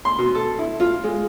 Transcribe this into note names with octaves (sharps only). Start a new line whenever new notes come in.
C6
B2
A4
E4
F4
G#3